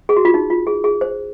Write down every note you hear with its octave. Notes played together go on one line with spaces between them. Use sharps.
G#4
F#4
F4
D#4
F4
G#4
G#4
C5